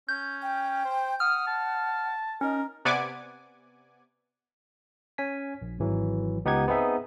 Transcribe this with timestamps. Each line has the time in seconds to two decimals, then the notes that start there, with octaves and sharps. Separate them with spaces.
0.09 C#4 G6
0.42 G5
0.85 C5
1.20 F#5 D#6 F6
1.47 A5
2.41 C#4 D#4 A#4
2.85 C3 B3 D5 F#5 G#5 D6
5.18 C#4 G#5 B6
5.62 A#1
5.79 G#1 E3 F#3
6.45 C#2 B3 D#4 G4 F#5 G#6
6.68 B3 C4 D#4 G#4 E5